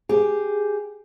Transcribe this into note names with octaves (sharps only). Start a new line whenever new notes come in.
G4 G#4